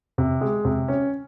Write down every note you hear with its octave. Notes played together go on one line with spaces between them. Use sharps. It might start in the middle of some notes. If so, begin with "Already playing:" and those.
C3
G#3
C3
C#4